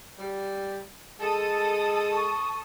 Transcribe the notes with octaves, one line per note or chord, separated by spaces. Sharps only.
G3
G#3 A4 D#6
C#6